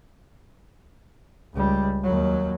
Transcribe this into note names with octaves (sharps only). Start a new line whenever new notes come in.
C#2 G3
D#2 F#3